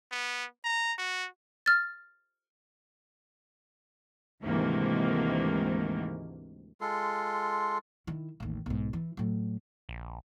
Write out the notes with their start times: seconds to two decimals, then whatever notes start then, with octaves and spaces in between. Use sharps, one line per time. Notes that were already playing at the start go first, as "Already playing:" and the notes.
0.12 B3
0.64 A#5
0.98 F#4
1.66 F6 A6
4.42 D2 G#2 C3 D#3 E3 A#3
6.81 G#3 F4 A4 C6
8.07 D#3 E4
8.40 A1 D#2
8.66 B1 G#2
8.93 E3
9.17 A2 F#3
9.89 A#1